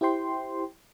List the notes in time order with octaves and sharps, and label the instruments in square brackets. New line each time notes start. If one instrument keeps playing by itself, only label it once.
[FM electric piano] E4 G4 C5 G5 C6